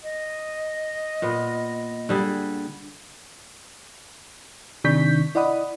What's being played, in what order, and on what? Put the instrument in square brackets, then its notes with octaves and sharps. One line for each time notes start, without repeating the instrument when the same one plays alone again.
[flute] D#5
[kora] A#2 B3
D3 G3 G#4
[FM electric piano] C3 D#3 D4 C#6 G6 B6
E4 D5 D#5 F#5 B5 D#6